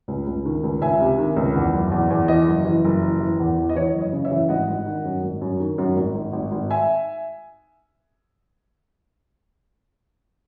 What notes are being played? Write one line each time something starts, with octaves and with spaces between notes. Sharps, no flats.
C#2
C#2
D#3
C#2
C#2 E5 G#5
C3
D#3
C#2
E2
F#1
E2
E2
E3 D#5
F#1
E3
F#1
E3
E3
E2
E3
D#5
E3 C#5
F#1
D#5
C#3
C#5 E5
E3
G#1 D#5 F#5
G#1
D#3
F#2
G#1
F#2
D#3
F#2
G#1
G#1
G#1
G#1
E5 G#5